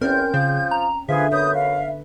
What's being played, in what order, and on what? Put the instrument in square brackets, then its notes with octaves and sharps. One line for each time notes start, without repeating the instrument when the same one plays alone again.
[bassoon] E2 [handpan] C4 C#4 C5 [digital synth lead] A#4 [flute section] G6
[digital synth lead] C#3 [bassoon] F3
[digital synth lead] A#5
[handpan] D3 [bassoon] F3 [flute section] G#4 B4 [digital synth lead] E5
[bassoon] F#2 [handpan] B4 [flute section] D#6 G6
[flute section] F5